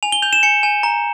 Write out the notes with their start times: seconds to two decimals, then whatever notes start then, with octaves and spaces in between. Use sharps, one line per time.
0.03 G#5 F7
0.12 G7
0.22 G6 F7
0.33 E7
0.43 G#5 C#7
0.63 G#5
0.83 A#5